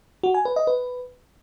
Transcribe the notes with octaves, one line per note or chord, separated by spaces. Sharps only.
F#4
G#5
B4
D#5
B4